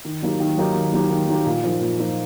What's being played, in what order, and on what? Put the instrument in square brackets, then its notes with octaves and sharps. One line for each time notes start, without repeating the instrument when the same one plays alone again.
[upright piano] D#3
F#3 A#3 D#4 G4
D#3
F#3 A#3 D#4 G4
D#3
F#3 A#3 D#4 G4
D#3
F#3 A#3 D#4 G4
A#2
F3 A#3 D#4
A#2
F3 A#3 D#4